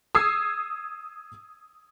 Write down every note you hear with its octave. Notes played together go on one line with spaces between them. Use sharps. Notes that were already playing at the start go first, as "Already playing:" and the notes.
D#6 E6 G#6 C7